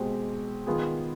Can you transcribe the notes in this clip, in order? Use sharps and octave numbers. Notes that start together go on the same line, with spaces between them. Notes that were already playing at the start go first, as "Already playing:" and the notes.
Already playing: B2 G#3 C4 G4
D#3 B3 F4 G#4